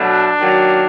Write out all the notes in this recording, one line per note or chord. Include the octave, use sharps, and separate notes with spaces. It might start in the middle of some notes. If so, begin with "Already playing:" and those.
Already playing: B2 F#3 A3 D4
D#3 F#3 A#3